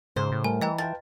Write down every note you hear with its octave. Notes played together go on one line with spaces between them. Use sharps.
G#2 C#3 C5
A2
G3 A3 A#4 G#5
E3 D#5 G5 A#5
F3 B4 G5 A5 A6